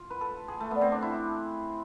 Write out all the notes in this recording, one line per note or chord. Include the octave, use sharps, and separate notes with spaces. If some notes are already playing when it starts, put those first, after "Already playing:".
Already playing: F4
B4
A4
G#4
A3
B3 D5
C4
D4
E4